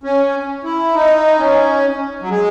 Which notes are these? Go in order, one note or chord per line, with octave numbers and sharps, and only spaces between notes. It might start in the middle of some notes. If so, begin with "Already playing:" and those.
C#4
E4
D#4
C#4
F#3
G#3